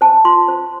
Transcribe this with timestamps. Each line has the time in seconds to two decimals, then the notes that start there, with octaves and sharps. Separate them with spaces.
0.01 C5 A5
0.25 F4 C6
0.48 C5